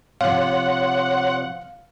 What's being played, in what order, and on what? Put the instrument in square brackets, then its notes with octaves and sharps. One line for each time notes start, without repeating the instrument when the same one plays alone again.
[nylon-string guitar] C3 F3 [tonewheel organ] C#5 C6 [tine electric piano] F5 [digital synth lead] F#5